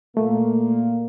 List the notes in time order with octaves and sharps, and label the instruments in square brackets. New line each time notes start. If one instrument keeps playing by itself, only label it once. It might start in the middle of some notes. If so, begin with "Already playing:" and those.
[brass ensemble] A#2 A#3 [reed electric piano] A3